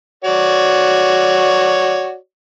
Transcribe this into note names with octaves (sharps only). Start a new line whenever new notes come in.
F#4 C#5 D5